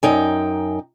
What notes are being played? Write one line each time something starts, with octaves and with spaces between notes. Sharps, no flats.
F#2 D#4 G5